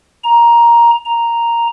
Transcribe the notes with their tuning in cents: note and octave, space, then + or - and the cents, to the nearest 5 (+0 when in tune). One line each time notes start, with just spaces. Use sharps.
A#5 +10
A#5 +0